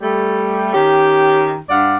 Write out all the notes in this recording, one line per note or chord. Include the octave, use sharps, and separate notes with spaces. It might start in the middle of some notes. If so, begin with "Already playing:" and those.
G3 A3
D#3 C#4 G4
G2 D5 F5 F#5